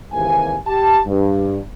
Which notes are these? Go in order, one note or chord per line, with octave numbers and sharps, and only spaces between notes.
D#2 G#2 C3 E3 A#3 G#5
G4 A5
G2